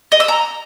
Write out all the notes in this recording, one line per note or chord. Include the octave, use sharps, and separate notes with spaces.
D#5
E6
A#5